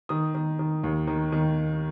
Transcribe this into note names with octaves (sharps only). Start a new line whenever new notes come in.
D#3 D#6
D#3
D#3
D#2
D#3
D#3